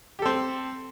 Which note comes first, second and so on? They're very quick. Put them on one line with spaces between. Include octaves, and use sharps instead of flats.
G4 A4 C4